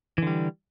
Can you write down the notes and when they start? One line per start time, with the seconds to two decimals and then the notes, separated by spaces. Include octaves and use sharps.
0.18 E3
0.22 D3
0.27 G3